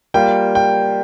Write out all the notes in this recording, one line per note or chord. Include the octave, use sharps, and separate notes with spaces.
G3 A#3 F4 G5
G5